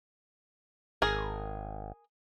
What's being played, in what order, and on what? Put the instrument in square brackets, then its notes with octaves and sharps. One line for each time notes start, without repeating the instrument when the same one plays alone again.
[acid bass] G#1 [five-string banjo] G#4 A#4